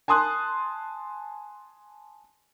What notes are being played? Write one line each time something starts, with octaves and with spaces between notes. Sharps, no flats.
G#5 A5 C6 D#6 F#6